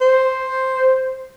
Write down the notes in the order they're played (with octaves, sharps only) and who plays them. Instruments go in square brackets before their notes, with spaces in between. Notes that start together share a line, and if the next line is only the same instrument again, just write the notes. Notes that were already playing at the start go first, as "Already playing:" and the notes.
[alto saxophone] C5